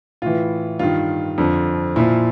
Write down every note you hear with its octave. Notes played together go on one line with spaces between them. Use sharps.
A2 E3 F4
G2 D#3 F4
F2 D3 F3
A#2 F3 E4